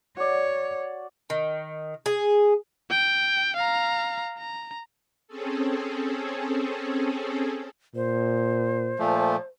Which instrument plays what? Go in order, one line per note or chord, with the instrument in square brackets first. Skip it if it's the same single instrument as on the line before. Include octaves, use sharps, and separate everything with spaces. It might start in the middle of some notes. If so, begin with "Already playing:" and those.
[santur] F#4 D5 [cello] C#5
[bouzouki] D#3
G#4
[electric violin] G5
F5 A#5
A#5
[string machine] C4 C#4 G#4 A4
[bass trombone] A#2 [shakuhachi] C5
[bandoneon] A#2 F3 A3